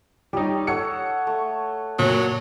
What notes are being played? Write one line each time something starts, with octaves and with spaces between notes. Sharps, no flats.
G3 D#4 G4 C#5 D#5
A4 C#5 F#5 C#7
A3
A#2 F#3